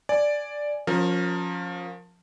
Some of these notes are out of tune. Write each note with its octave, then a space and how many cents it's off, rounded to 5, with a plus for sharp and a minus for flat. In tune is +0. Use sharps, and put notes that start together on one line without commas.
D5 +0 G#5 +0
F3 +25 C#4 -5 A#4 +0